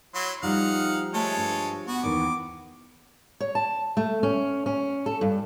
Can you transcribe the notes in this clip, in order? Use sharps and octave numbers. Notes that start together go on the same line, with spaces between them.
F#3 E4 C6
F3 G3 D#4 F5 F#5
G#3 A3 A4 C#5
G2
B3 F#4
D#2 D#3 E3 D6
C#5
A5
A3
C#4
C#4
A4
G2